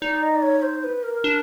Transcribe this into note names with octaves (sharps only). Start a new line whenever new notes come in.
D#4 D5
D#5
D5
C#5
C5
B4
A#4
D4